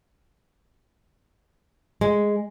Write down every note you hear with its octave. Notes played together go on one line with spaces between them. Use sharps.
G#3